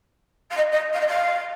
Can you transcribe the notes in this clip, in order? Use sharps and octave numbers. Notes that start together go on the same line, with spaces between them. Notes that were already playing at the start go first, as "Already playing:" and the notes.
F5
D#5
D#5
F5
D#5
F5